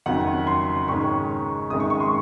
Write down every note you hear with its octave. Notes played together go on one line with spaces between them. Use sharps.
F#1 F2 D#3 F#3 F#5
C6
G#2 D#3 G#3 C#4 C#6
G#1 F#2 D#3 G#3 D#6
C#6
C#6
C6